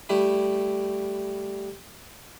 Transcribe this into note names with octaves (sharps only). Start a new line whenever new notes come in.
G3 A3 E4